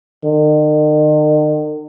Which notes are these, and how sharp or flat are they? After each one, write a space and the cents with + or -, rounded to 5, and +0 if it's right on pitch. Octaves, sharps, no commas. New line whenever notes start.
D#3 -40